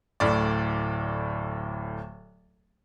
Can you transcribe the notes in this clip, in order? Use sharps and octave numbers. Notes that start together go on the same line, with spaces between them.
D1 A2 D5